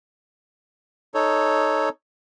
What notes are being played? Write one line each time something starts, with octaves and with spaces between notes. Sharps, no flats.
D#4 A4 C#5